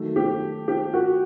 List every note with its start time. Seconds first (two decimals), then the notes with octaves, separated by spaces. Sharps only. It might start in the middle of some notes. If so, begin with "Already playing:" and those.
Already playing: D#3 F#3 A3
0.16 G4
0.68 G4
0.94 F#4